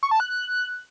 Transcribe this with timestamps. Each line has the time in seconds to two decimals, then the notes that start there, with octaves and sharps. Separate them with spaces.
0.03 C#6
0.11 A5
0.20 F#6